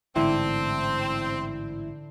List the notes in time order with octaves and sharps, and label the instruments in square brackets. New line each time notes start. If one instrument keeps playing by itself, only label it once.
[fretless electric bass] A1 G#2 [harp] D3 [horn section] C4 [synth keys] E4